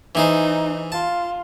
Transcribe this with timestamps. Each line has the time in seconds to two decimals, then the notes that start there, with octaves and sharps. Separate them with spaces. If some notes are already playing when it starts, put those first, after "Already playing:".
0.15 E3 D#4 G#4 C5
0.92 F4 A5